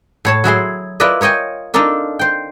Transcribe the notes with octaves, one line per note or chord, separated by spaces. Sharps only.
A2 C#5 A5
F#3 E4 G#4 C6
E4 F4 A#4 B4 D5 D#5
A#4 C#5 D#5 G5 G#5
D4 D#4 F4 A4 A#4 D5
C5 G5